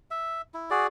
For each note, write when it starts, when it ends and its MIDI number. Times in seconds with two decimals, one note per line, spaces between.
0.11 0.41 76
0.54 0.70 64
0.70 0.87 66
0.70 0.87 68
0.70 0.87 74